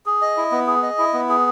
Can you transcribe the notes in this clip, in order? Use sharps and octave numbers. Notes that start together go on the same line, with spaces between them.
G#4
D#5
E4
B3
G#4
D#5
E4
B3
G#4